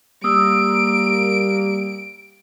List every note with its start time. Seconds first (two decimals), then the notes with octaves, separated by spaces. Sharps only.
0.24 G3 A#3 D#6 E6 D7